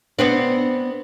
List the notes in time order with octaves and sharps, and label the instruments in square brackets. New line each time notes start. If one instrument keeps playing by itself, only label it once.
[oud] B3 C4 D4